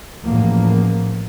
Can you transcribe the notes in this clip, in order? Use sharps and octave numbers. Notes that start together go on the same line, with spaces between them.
A1 E2 F3 A#3